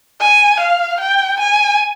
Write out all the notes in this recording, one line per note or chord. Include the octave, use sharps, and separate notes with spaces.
G#5
F5
G5
G#5